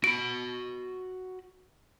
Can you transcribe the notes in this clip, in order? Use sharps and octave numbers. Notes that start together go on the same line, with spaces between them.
F#4 B5 D7